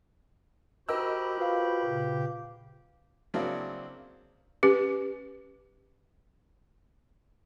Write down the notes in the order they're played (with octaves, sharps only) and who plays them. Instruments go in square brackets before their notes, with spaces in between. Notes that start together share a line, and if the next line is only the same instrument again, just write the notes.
[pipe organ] F#4 C5 B5 [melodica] G4 [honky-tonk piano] A#4 D#5 E6
[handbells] F4 B4 F5
[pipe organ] A#2 C#3
[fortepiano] C#3 F#3 A#3 C4 D4 E4
[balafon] C#4 G4 B4